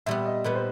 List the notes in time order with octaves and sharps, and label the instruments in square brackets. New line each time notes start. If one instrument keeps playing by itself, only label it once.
[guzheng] A#2 G3 B3 [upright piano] E5
[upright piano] D#5
[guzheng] A#2 G3 B3 [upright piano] B4
[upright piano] C5